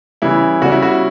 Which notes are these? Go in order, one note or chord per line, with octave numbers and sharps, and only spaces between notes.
C#3 E3 G3 E4
C#3 G3 F#4
E4
F#4